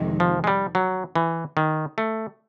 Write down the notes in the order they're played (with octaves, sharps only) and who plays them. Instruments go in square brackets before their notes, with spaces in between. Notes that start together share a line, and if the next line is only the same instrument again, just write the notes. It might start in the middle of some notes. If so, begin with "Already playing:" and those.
Already playing: [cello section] F2 C3 D#3 G#3
[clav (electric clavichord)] F3
G#3
G3
F#3
E3
D#3
A3